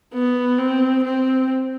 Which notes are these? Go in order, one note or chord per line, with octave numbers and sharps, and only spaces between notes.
B3
C4
C4